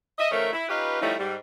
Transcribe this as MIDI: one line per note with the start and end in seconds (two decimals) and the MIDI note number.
0.18 0.30 75
0.18 0.30 76
0.31 0.48 51
0.31 0.48 53
0.31 0.48 57
0.31 0.48 61
0.31 0.48 70
0.31 0.48 76
0.53 0.68 64
0.69 0.99 61
0.69 0.99 63
0.69 0.99 65
0.69 0.99 67
0.69 0.99 71
1.02 1.14 53
1.02 1.14 55
1.02 1.14 57
1.02 1.14 61
1.02 1.14 63
1.02 1.14 64
1.19 1.36 44
1.19 1.36 55